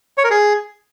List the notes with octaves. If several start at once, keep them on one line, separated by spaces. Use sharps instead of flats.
C#5
A#4
G#4